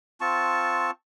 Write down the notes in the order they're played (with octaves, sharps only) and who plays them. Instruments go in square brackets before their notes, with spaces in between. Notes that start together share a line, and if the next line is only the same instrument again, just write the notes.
[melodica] C4 F4 A5 C#6